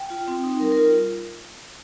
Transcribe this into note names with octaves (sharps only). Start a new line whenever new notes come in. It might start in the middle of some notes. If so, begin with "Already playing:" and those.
Already playing: G5
F4
C4
D#4
G3 A#4
A#4
F4